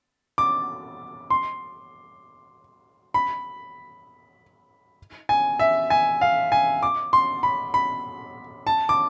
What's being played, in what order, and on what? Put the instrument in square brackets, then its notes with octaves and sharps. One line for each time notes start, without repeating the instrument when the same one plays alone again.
[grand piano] D6
C6
B5
G#5
E5
G#5
F5
G#5
D6
C6
B5
B5
A5
D6